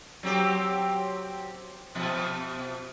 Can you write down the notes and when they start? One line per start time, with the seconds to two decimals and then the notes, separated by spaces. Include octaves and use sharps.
0.23 F#3 C4 G4
1.95 B2 F3